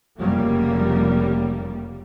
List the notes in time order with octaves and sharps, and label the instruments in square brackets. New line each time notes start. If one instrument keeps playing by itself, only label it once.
[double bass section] F1 C#3 G3 A#3